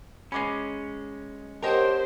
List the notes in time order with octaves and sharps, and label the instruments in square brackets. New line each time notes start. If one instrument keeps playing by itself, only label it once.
[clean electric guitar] G#3 C#4 [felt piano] B5 D6 C7
[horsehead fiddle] G4 C5 [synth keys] A#4 C#5 F#5 [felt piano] D#5 G5 A5